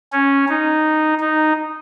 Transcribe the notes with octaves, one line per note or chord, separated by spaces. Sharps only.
C#4
D#4
D#4